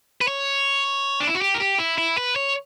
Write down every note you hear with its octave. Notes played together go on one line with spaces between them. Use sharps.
B4
C#5
D4
E4
F#4
G4
A#4
G4
E4
E4
B4
C#5